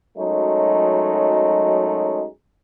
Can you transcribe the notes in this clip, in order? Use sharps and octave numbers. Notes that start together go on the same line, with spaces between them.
F#2 F#3 G#3 A3 D#4